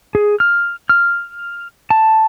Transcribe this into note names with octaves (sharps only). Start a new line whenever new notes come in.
G#4
F6
F6
A5